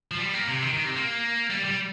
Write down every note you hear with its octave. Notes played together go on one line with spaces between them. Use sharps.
F3
G3
A#3
C3
D#3
D#3
C3
A#3
G3
G3